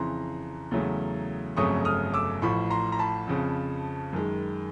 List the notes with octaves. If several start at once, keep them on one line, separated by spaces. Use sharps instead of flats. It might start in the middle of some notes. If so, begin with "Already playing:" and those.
Already playing: F2 C#3 E3 A#5 C6
E2 C#3 F#3 A3
G1 F2 C#3 F#3 A3 C#6 D#6
D#6 F6
D6 E6
A1 A2 F3 B5 C#6
A#5 C6
A#5
A5 B5
F2 C#3 F3
F#2 D#3 G#3